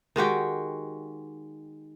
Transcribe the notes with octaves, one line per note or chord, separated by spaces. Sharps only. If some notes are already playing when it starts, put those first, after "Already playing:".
D#3 G#3 F#4 G4